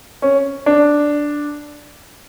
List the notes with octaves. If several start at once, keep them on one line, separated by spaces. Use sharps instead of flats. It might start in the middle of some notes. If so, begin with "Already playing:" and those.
C#4
D4